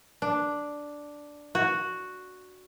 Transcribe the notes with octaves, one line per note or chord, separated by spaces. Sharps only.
D4
F#4